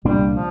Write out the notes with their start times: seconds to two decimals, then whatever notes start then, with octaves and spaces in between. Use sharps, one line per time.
0.05 C2 A#2 G3 A#3 D4
0.34 F3